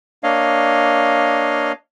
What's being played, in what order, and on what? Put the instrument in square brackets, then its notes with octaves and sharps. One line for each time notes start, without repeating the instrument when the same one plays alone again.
[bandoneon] A#3 D4 C#5 D#5 F5